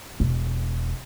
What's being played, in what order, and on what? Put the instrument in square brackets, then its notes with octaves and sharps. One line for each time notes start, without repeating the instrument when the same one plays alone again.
[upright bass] E1